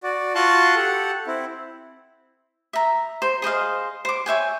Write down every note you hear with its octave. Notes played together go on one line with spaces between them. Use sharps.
F#4 D5
F4 F#4 A5 C6 C#6 F#6
G4 A4 F#5
C4 E4
E5 A#5
C5
G#4 C5 D#5 F5
C5 D6
C#5 E5 G5 G#5